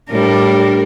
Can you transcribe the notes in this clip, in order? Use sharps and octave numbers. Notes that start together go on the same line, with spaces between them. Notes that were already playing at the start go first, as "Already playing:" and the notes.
A2 G3 D4 A#4